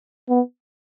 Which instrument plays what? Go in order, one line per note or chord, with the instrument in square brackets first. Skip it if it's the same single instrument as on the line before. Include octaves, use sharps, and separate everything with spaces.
[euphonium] B3